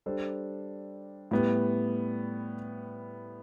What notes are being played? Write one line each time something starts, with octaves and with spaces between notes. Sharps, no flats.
G3 D4 A4 C5
A2 G3 B3